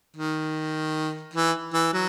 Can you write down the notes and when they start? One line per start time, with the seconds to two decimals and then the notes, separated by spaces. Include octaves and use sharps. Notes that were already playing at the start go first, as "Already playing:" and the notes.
0.16 D#3
1.34 E3
1.74 E3
1.93 F#3